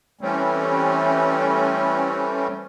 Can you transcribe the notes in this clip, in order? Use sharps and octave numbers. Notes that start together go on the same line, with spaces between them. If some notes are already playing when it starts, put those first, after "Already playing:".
E3 G3 A3 C4 C#4